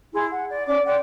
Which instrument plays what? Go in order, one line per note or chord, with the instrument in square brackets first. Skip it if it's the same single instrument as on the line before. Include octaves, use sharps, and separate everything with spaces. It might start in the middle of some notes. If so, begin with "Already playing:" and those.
[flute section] E4 G#4 C6
F#5
D5
C#4 D5 D6
C5 D5 F#5 G5